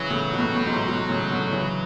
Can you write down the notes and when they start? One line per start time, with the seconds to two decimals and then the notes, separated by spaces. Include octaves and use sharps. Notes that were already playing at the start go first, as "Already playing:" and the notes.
Already playing: C#3 E3 F#3
0.10 A2 C#3
0.33 B2
0.39 A2 C#3
0.56 A2
0.67 G#2 B2
0.88 G#2 B2
1.09 A2 C#3
1.30 B2 D3
1.51 C#3 E3